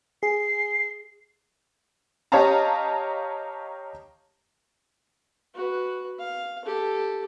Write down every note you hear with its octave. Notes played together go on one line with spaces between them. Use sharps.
G#4 C7
G4 C#5 D#5 F5 A5 A#5
F#4 B4
F5
G4 A4